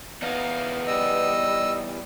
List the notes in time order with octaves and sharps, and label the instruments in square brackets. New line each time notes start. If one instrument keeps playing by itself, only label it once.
[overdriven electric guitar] E2 D#4 [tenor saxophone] B3 [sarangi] F5
[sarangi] G3 [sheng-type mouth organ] D#5 E6